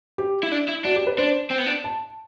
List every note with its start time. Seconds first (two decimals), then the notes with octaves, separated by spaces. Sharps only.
0.18 G4
0.43 E4
0.52 D4
0.69 E4
0.85 D4 F#4
0.96 G4
1.07 B4
1.18 D4 C5
1.51 C4
1.59 B3
1.67 D4
1.84 A5